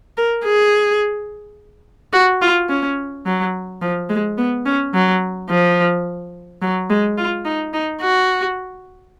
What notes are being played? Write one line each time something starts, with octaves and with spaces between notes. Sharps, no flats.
A#4
G#4
F#4
F4
C#4
F#3
F3
G#3
B3
C#4
F#3
F3
F#3
G#3
F4
D#4
D#4
F#4